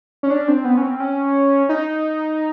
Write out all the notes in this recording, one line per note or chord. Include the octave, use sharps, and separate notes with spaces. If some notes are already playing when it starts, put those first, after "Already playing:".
C#4
D4
C4
B3
C#4
C4
C#4
D#4